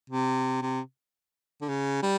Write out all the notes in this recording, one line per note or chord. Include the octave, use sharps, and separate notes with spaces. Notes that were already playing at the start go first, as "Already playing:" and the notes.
C3
C3
D3
C#3
G3